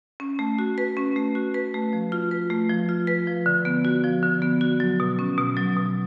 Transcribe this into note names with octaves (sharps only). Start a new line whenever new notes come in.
C#4
A3
F#4
B4
C#4
A3
F#4
B4
A3
F3
F4
B4
A3
F3
F4
B4
F3
D3
B3
F#4
F3
D3
B3
F#4
F#3
B2
C#4
B2
F#3
B2